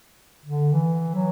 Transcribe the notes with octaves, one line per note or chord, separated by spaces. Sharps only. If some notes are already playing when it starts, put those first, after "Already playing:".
D3
E3
F#3